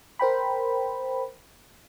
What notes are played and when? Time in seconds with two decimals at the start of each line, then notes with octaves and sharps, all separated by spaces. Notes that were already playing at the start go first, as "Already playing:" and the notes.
0.19 A#4 C5 G5 B5